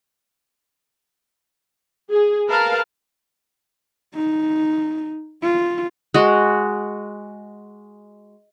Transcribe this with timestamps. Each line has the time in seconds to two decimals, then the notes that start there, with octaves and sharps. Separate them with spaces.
2.11 G#4
2.49 A#4 B4 F5 A5
4.14 D#4
5.43 F4
6.14 G#3 F#4